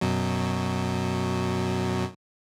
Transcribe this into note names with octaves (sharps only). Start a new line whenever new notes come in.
F#2 B2 F#3